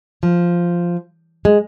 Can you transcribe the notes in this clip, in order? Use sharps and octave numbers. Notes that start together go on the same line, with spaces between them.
F3
G#3